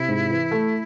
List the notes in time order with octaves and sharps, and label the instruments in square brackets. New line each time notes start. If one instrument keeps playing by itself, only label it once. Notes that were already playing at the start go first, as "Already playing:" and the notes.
Already playing: [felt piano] C3 [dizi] E4
[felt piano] G#2
E3
A3